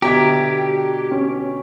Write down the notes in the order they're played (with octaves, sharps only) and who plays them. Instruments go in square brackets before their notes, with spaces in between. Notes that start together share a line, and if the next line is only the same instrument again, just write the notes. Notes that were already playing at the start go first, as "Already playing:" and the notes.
[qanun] B2 D3 E5 [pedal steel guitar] G4 [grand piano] A#5 G#6 B6
[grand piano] C#4